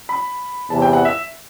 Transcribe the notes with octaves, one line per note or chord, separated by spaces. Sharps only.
B5
E2 C3 E3 A5
G5
F#5
E5